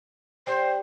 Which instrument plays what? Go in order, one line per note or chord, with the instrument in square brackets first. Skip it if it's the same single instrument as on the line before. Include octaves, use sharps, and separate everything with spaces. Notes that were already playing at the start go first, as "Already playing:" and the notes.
[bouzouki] G3 C4 D4 [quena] C5